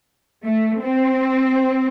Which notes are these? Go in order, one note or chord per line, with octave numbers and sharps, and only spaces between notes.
A3
C4